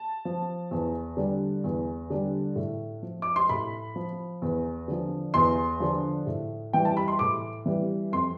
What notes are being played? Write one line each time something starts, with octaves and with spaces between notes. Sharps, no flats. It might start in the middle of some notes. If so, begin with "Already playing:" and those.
Already playing: A5
F3
E2
D3 G3
E2
D3 G3
A2
F3
D6
C6
A2 B5
F3
E2
D3 F3
E2 C6
D3 F3
A2
E3 G3 G5
A5
B5
C6
A2 D6
E3 G3
F2 C6